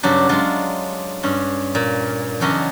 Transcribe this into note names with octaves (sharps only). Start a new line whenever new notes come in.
G2 C#3 F#3 D4 G4
F#3 G#3 D4 F4
G2 C#4
A#2
E2 C#3 F#3 C#4 D4 D#5